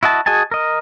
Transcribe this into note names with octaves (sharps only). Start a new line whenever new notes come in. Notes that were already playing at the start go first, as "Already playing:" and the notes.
E4 F#4 D#5 A5
F#4 G#4 D#5 G#5 A5
A#4 D#5